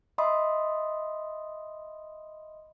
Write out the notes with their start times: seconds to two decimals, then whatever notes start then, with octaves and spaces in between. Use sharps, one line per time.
0.18 D#5 E5 B5 C6 D#6